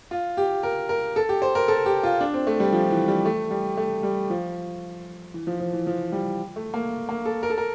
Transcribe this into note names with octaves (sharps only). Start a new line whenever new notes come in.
F4
G4
A#4
A#4
A4
G4
C5
A#4
A4
G4
F4
D4
C4
A3
G3
F3
E3
G3
A3
G3
A3
G3
F3
E3
F3
F3
E3
F3
G3
A3
A#3
A#3
A4
A#4
A4
A#4